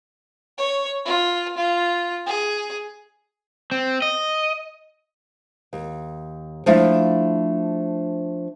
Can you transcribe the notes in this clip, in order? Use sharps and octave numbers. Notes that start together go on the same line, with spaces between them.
C#5
F4
F4
G#4
C4
D#5
D#2
F3 A3 D4 E4 E5 F5